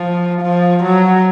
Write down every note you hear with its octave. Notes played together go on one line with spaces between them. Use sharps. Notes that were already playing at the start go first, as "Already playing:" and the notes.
Already playing: F3
F3
F#3